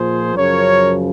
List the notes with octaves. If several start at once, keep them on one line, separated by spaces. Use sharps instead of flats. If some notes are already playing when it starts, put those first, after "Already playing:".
Already playing: A#2 F3 G#4 C5
F#2 C#3 F3 A#4 C#5